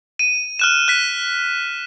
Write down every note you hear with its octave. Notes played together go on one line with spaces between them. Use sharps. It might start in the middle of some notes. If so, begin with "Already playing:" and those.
D#7
F6 F#6 E7
F#6 B6